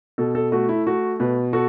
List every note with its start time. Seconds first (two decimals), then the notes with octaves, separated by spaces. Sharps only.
0.18 B2 A4
0.35 A4
0.52 A3 F#4
0.69 E4
0.87 A3 F#4
1.20 B2 B4
1.53 F#4 A4